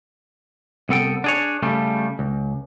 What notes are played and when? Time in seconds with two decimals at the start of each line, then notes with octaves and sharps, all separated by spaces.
0.89 C2 B3 A4 G5
1.24 D4 G#4 C#5
1.63 C#3 G3 A3
2.19 C#2